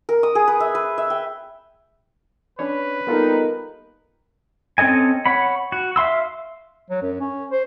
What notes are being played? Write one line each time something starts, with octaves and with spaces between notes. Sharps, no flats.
A#4
D#6
G#4
B4
E5
B4
E5
G5
C#4 D4 B4 C#5
G3 A#3 B3 D#4 F4 A4 A#4
C4 C#4 A4 D#5 G#5
C#5 F#5 B5
F#4
E5 F5 C6 E6
F#3
F#2
C#4
C5